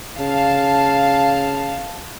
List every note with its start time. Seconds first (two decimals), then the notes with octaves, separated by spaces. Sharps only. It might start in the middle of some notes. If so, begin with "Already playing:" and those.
0.19 C#3 F5 A5